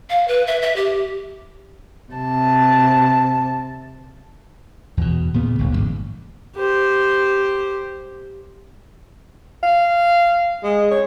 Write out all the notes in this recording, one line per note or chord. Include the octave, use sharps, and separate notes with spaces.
F5
B4
E5
E5
G4
C3 A5
E2 B2
A#2 C#3 B3
G1 D2
A1 D#2 G#2
G4 C5
F5
G#3
C#5